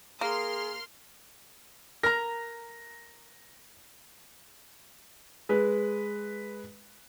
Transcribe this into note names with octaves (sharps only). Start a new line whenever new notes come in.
A#3 G#4 A#4 C6 F6
A#4 A#5 A#6
G#3 B4